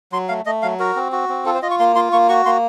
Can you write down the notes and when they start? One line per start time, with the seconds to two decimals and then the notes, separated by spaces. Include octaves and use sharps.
0.12 F#3 C6
0.29 A3 F5
0.46 A3 D#5
0.62 F#3 F5
0.79 F#4 A#4
0.96 C4
1.12 F#4
1.29 C4
1.46 F4 A4
1.54 C5
1.62 F4 D#5
1.71 C#6
1.79 A#3 C6
1.95 F4 C6
2.12 A#3 C#6
2.29 F#4 C#6
2.46 A#3 C6